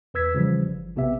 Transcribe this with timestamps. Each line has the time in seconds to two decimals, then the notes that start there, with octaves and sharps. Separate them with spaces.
0.14 E2 B4 E6 G#6 B6
0.34 C#3 E3 F3 G3
0.66 G1
0.96 A#1 C3 B3 G4 E5